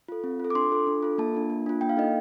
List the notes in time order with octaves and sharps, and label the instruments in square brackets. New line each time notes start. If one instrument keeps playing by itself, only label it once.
[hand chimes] F4 A4
C4
F4 A4
D6
D4 C6
F4 A4
D4
F4 A4
A#3 A5
D4 F4
A#3
D4 F4
A#3 G5
F5
D#4 A4 D#5